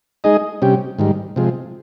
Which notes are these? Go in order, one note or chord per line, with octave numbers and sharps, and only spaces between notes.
G#3 D#4 G#4 D#5
C3 G3 C#4 G4
G#2 D#3 G3
C3 F3 G#3